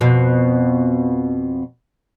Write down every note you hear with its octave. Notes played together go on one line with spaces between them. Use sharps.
F2 B2